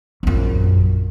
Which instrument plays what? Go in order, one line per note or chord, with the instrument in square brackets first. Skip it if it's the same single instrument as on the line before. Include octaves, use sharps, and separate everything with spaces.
[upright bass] A#1 F#2